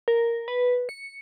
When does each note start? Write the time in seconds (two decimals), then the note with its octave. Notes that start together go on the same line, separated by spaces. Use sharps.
0.08 A#4
0.48 B4
0.89 C#7